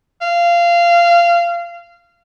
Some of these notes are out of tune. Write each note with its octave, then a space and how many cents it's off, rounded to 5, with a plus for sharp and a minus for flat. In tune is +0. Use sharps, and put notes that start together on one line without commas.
F5 -20